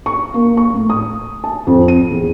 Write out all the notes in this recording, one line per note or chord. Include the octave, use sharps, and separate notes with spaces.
C#6
A#3
C#6
A2
D#6
A5
F2
D#7
E2